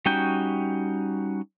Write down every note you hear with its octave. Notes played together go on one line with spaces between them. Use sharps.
G3 C#4 D#4 F#4 G5